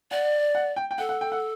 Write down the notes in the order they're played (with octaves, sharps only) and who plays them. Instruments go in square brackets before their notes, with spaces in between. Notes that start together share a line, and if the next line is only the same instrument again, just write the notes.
[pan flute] D5 [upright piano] F#5
[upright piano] F#5
G5
G5
[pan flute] A4 [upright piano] F#5
[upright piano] F#5
G5
F#5